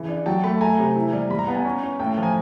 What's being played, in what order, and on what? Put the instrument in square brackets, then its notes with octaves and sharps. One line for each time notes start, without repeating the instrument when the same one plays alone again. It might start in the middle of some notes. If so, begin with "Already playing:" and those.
Already playing: [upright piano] C#3 E3
D4
[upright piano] F#3 [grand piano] G5 A5
[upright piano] A3 [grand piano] A5 B5
[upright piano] A3 [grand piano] G#5 A#5
[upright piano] C3
E4
G3
[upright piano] G3 [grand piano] B5
[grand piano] A#5
[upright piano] B3 [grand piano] A5
[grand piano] G#5 A#5
[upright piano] C#4
C#4
[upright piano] A2 [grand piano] G5 A5
[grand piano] G5 A5
[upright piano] F3
[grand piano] G#5 A#5